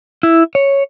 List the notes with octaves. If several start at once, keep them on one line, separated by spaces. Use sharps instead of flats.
E4
C#5